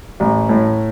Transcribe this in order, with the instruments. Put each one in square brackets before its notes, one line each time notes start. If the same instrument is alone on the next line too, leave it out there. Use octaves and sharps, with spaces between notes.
[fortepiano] A1
A2